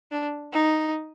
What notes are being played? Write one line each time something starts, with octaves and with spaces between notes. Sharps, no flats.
D4
D#4